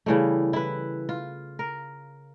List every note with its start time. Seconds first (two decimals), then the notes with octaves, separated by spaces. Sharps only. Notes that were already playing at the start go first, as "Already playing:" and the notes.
0.06 C#3 E3 G3 A3
0.53 E4 B4
1.09 F4
1.59 A#4